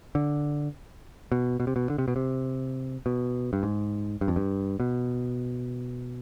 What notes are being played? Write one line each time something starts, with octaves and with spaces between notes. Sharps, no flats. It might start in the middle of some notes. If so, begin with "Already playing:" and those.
D3
B2
B2
C3
B2
D3
C3
B2
C3
B2
G2
G#2
G2
F2
G2
B2